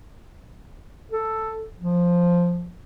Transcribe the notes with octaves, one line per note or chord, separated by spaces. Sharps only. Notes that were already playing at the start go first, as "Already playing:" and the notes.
A4
F3